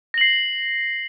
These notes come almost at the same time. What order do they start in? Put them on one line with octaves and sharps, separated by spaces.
A#6 F#7 C7